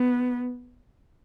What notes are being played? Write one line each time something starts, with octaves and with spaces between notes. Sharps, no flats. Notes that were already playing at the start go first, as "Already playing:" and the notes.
Already playing: B3